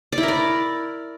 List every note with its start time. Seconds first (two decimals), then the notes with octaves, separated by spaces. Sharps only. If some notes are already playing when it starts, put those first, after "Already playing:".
0.12 D5
0.18 E4
0.23 A#4
0.28 D5